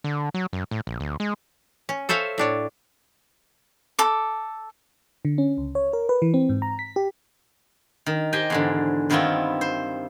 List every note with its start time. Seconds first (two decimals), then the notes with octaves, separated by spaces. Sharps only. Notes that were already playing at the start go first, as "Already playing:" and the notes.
0.04 D3
0.34 F#3
0.53 F#2
0.71 A2
0.87 A#1
1.00 D2
1.20 G#3
1.89 C#4
2.09 A4 C5 C#5 E5 F5
2.38 A2 D4 C#5
3.99 A4 D6
5.25 D3
5.38 C#4
5.58 C#2
5.75 C#5
5.93 A#4
6.09 B4
6.22 E3
6.34 C4
6.49 G#2
6.62 A#5
6.79 B6
6.96 G4
8.06 D#3
8.33 G4 C5 D#5 G5 G#5
8.50 E2 G#2 D3
9.10 G2 D#3 B3 C4 E4 F4
9.61 C5